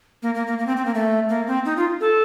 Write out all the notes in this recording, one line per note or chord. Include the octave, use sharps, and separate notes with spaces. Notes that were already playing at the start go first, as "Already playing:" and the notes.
A#3
A#3
A#3
A#3
C4
C4
A#3
A3
A#3
C4
D#4
F4
A4